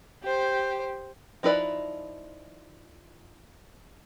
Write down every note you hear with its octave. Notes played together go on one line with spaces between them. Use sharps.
G4 C5
F3 D#4 E4 B4 D5